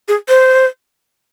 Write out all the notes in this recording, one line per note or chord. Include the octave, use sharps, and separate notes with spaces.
G#4
C5